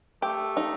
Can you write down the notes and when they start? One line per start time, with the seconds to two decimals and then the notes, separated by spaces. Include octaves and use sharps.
0.22 A3 G4
0.57 D#4